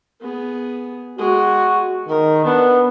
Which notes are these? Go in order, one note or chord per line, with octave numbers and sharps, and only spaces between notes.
B3 G#4
G#3 F#4 G#4
D#3 A#4
B3 D4